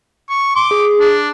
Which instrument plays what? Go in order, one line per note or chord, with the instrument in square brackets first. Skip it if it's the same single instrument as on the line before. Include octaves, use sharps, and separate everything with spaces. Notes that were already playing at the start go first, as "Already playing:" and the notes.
[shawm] C#6
[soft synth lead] C6 [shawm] D6
[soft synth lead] G#4
[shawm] D4